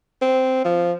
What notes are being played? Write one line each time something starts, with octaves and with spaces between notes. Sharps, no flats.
C4
F3